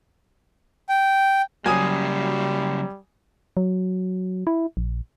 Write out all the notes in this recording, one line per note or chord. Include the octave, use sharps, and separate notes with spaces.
G5
C#3 F#3 G3 A#3 G#5 D#6
F#3
E4
A#1